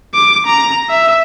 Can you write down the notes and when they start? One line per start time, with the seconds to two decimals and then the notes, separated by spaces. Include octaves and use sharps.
0.14 D6
0.46 A#5
0.90 E5